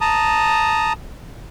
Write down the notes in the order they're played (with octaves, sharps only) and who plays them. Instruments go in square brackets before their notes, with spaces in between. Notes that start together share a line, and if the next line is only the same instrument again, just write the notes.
[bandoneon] A5 A#5 D#6